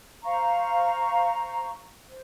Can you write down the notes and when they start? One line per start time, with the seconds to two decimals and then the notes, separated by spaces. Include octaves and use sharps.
0.24 C5 F5 A#5 C#6
2.08 C5